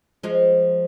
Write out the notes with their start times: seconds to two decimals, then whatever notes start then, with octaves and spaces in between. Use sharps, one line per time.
0.23 F3 G#3